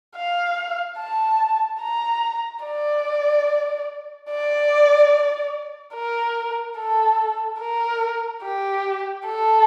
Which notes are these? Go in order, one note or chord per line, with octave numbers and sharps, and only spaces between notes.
F5
A5
A#5
D5
D5
A#4
A4
A#4
G4
A4